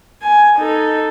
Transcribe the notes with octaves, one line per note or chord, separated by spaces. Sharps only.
G#5
D#4 A4